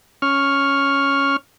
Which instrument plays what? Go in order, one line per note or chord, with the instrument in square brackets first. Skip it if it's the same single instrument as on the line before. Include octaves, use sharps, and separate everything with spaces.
[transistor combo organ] C#4 C#6 F6